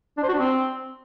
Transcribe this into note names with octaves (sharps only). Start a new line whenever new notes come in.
D4
C5
F#4
D4
C4